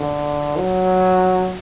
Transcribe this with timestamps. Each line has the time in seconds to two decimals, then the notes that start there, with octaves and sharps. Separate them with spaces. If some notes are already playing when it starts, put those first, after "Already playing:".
Already playing: D3
0.57 F#3